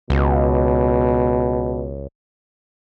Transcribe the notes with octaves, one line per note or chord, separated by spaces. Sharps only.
C#2 B2